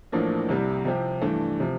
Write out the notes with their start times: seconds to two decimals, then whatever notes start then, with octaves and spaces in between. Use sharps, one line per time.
0.12 A1 A2 F3 A#3 D4
0.49 C2 C3 G3
0.85 C3 F3 C4 G4
1.22 G2 E3 A3 D4
1.60 C3 F3